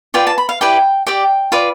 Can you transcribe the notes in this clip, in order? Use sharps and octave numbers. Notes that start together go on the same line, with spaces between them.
F4 B4 D5 G5
A5
B5
F5
E4 G4 B4 D5 G5
G4 D5 G5
F4 B4 D5